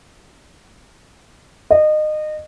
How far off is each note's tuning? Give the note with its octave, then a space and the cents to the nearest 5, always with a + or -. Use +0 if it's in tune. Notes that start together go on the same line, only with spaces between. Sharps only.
D#5 -25